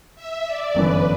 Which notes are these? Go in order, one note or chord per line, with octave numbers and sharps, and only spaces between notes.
E5
D5
G1 F#2 E3 B3 D4 B4